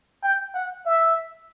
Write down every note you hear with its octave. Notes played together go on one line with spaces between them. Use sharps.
G5
F#5
E5